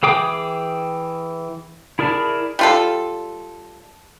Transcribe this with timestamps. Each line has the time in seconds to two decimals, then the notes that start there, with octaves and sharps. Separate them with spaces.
0.03 E3 G#4 G5 D6 D#6
1.99 E4 G#4 A#4 D5 A5
2.59 G3 F4 A4